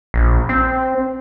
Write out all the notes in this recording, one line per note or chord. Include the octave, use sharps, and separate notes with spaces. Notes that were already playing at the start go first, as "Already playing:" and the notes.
A#1
C4